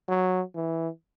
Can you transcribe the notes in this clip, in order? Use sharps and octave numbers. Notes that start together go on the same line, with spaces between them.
F#3
E3